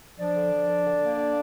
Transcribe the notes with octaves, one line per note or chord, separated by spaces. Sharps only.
F3 D4 D5
D3
F3
D3
D3
A#3
D3